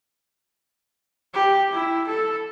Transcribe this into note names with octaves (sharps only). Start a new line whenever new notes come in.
G4
E4
A4